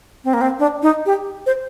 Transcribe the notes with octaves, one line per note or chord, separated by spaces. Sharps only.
C4
A#3
C4
D4
D#4
G4
C5